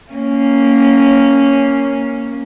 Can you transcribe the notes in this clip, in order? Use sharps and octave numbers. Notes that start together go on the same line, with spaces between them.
A#3 C#4